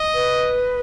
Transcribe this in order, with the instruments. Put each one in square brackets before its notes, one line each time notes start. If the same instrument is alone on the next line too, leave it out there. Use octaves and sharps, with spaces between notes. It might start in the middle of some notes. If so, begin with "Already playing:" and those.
Already playing: [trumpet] D#5
[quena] B4